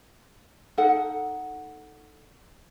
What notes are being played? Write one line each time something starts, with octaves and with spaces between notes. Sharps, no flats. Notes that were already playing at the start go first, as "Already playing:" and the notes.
D#4 A4 F#5